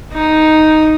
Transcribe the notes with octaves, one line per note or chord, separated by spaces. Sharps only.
D#4